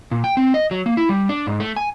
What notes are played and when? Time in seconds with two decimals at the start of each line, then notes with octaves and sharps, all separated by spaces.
0.11 A#2
0.24 G5
0.37 C4
0.54 D#5
0.71 F#3
0.86 A#3
0.97 E4
1.09 G3
1.29 D4
1.47 G#2
1.60 A3
1.76 G#5